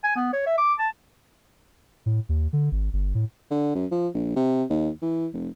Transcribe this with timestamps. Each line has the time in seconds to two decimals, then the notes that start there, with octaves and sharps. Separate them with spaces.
0.04 G#5
0.16 B3
0.33 C#5
0.47 E5
0.58 D6
0.79 A5
2.06 A2
2.29 D#2
2.53 D3
2.72 G#1
2.93 G1
3.15 A2
3.51 D3
3.75 F#2
3.91 F3
4.14 A#1
4.36 C3
4.70 D#2
5.02 E3
5.33 F1